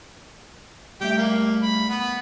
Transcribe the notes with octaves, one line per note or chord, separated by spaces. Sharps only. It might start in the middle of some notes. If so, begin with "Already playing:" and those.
G3 A3 G4 E5
A#3
B5
B3 B5